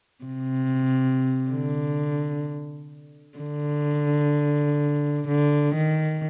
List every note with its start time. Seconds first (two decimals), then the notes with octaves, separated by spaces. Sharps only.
0.24 C3
1.51 D3
3.38 D3
5.27 D3
5.75 D#3